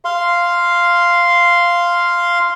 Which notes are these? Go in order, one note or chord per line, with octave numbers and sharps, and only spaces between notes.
F5 C6